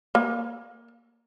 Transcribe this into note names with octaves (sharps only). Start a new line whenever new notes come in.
A#3